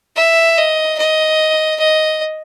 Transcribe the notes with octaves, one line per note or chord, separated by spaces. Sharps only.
E5
D#5
D#5
D#5